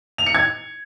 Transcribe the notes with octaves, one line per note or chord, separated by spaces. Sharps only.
F7
C#7
G#6